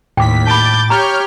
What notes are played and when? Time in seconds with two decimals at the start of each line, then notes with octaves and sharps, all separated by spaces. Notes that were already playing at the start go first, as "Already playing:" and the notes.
0.17 D#2 A2 G5 D6 B6
0.47 A5 B5 D6 G6 A6
0.90 G4 C#5 A#5 F6 G6